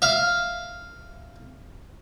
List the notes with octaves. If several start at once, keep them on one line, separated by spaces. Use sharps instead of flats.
E5 F5